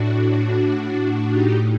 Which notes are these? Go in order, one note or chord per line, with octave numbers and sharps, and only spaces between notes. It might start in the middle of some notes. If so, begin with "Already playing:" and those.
Already playing: A2 D4 F#4
D#4 G4